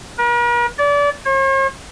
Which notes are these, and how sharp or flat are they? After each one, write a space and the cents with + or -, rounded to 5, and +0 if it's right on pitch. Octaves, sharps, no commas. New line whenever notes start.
A#4 +45
D5 -30
C#5 -45